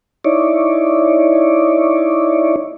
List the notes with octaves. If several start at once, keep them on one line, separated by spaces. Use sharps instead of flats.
D#4 E4 C#5 D5